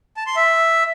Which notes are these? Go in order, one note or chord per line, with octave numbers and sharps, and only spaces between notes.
A5
C6
E5